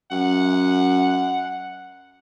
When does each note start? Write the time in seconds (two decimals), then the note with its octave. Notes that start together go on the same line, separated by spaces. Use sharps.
0.11 F#2 F#5